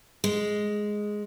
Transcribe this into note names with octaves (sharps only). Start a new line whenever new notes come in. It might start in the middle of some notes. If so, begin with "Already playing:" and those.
G#3